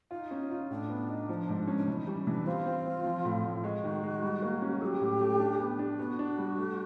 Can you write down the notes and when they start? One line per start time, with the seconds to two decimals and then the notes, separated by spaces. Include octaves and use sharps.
0.11 D#4 F4
0.31 C#4
0.51 F4
0.70 A2 D4
0.90 B3
1.09 D#4
1.29 F3
1.49 G#2
1.68 C#4
1.77 D4
1.87 E3 D#4
2.07 G3 C#4
2.27 E3 D4
2.46 C4 F4
2.66 C4
2.85 C4
3.05 F3
3.25 A2
3.44 A2
3.64 G#3 F#4
3.84 D#3
4.03 G#3
4.23 G3
4.42 A#3
4.62 C#4
4.81 F#3 G4 A4
5.00 A2
5.21 A3
5.40 D4
5.60 B3
5.79 D4
5.98 B3 F#4
6.19 D4
6.38 G3
6.58 A3